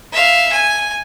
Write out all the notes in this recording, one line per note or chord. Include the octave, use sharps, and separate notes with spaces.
E5 F5
G#5